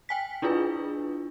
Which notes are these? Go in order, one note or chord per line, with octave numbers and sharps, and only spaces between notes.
G5 G#5 B6
D4 E4 F4 G#4 B4